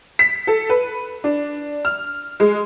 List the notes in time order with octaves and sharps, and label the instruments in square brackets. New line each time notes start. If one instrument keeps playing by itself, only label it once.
[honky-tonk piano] B6
A4
B4
D4
F6
G#3